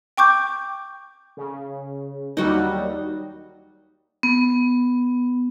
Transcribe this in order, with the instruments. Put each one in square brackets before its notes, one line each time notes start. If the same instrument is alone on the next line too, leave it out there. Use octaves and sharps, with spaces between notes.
[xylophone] G5 C#6 D6 G6
[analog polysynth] C#3
[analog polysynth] D#2 F#3 G3 [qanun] D#4 F#4
[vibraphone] B3